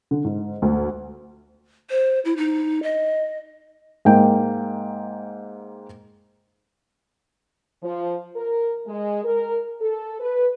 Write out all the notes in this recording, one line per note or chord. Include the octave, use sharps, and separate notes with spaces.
D3
G#2
D2
C5
E4
D#4
D#5
G#2 A#3 G5
F3
A#4
G#3
A#4
A4
B4